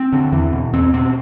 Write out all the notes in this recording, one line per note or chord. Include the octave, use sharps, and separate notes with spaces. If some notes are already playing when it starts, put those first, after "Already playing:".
Already playing: C4
D3
E2 E3
B2
E2 C4
B2 C4